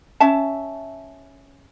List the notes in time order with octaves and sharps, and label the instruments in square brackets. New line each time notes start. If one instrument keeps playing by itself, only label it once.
[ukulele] C#4 E5 A5